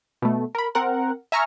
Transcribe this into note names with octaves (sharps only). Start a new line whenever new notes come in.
B2 A3
A#4 B5
C4 A#4 F#5
E5 G#5 A#5 C#6 F6